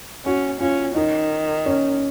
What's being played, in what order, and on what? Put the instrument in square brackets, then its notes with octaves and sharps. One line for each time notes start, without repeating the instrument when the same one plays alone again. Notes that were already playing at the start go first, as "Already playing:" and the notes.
[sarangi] C#4 [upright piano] F#4
[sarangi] C#4 [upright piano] F4
[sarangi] D#3 [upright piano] D#4
[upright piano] C#4